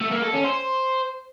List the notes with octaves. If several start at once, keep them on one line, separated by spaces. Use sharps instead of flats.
A3
A#3
A4
C#4
C5